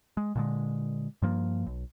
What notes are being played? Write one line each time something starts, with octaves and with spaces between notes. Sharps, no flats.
G#3
A#2 D3 G#3
G2 F3 A#3
B1